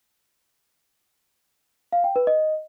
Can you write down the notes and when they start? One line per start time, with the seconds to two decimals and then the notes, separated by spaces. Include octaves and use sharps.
1.92 F5
2.04 G5
2.16 B4
2.27 D#5